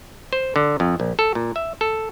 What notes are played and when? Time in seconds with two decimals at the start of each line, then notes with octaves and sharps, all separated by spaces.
0.33 C5
0.56 D3
0.80 F2
1.00 A#1
1.19 A4
1.35 A#2
1.56 E5
1.81 A4